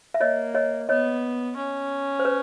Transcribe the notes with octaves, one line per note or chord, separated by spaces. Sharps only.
E5
A#3 C#5 D#5
C#5 D#5
B3 C#5 D#5
C#4
C5
B4 C#5